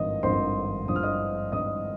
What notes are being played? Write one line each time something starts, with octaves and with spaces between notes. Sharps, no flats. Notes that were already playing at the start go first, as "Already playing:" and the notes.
Already playing: G#1 G2 F3 D#5 D#6
G#1 G2 F3 C5 C6
G#1 G2 F3 D#6
F6
D#5 D#6
G#1 G2 F3 D#5 D#6